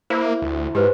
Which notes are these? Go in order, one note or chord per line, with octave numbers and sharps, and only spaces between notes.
A#3 E4 C5 E5
D2
G#2 G4 B4 C5